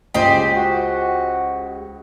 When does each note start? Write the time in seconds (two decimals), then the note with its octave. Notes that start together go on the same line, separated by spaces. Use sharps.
0.14 C#2 F4 G4 G#4 C5 D#5
0.57 F#4